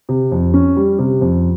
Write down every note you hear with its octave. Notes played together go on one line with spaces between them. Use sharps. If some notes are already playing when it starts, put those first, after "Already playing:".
C3
F2
C#4
G3
C3
F2